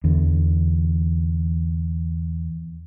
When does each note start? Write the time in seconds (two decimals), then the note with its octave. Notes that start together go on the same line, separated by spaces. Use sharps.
0.04 E2 D3